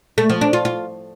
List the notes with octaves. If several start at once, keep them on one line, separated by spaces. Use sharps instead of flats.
A3
F3
D4
F4
F4